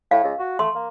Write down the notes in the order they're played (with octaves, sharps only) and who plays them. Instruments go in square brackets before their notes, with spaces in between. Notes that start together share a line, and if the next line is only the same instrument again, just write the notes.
[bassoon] A2 [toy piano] F5
[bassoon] C#2
F#4
[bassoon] A3 [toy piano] C6
[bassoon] A#3